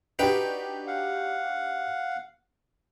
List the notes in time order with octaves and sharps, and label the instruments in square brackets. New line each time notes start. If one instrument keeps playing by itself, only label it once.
[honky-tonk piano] D4 F#4 G4 [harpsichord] D#4 B4 G5
[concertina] F5 F#5